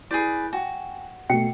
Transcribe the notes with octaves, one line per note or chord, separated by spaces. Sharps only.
E4 G#4 B4 D5 G6
F#4 G5 G#5
B2 A3 G5 C7 C#7